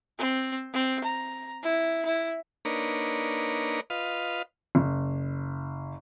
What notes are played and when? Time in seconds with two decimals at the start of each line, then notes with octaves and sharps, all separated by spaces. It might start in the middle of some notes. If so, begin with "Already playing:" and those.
0.19 C4
0.74 C4
1.05 A#5
1.63 E4
2.05 E4
2.65 A#3 D4 D#4 A#4 B4 C#5
3.90 F4 B4 D#5 F5
4.75 F#1